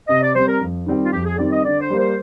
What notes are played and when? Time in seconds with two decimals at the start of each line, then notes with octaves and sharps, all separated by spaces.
0.08 C3 D#5
0.22 D5
0.35 G3 C4 C5
0.48 A#4
0.61 F2
0.86 D#3 G3 C4 G4
1.04 F4
1.12 F2 G4
1.25 G#4
1.38 D#3 G3 C4 G4 D5
1.52 D#5
1.64 D3 D5
1.81 C5
1.90 G3 A#3
1.99 C5